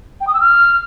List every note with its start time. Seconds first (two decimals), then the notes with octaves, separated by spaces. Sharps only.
0.21 G5
0.27 D#6
0.34 E6
0.41 F6